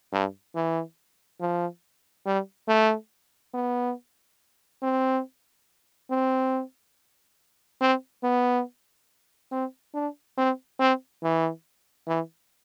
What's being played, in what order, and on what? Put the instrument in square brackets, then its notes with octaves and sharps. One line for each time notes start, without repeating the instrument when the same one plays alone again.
[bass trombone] G2
E3
F3
G3
A3
B3
C4
C4
C4
B3
C4
D4
C4
C4
E3
E3